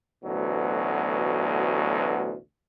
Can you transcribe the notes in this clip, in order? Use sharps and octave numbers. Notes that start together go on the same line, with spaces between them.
A1 D2 B2 F#3